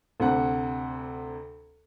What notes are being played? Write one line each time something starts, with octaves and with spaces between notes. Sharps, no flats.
D2 C3 F#5